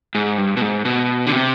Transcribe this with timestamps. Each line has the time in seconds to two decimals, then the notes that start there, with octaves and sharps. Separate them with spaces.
0.15 G#2
0.38 G2
0.57 B2
0.62 G#2
0.85 B2
1.27 D3
1.32 C3